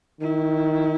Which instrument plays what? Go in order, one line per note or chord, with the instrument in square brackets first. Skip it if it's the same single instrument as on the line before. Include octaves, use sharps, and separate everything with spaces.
[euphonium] D#3 [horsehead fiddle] E4